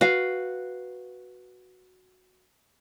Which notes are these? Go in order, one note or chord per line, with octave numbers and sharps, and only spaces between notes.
F#4 B4 F5